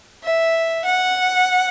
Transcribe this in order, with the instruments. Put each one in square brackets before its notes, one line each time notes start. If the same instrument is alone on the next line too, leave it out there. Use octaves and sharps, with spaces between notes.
[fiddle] E5
F#5